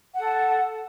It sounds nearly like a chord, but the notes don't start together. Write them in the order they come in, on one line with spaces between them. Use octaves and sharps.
F#5 A4 A5